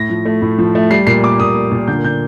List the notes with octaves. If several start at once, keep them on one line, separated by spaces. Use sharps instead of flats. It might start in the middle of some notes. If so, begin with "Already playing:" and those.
Already playing: A2 A#6
F3
A3
A2
F3
A3
G3 C7
A#2 C7
A#3 D6
A#2 D#6
A#3
A#2
D3 G6
D3 G6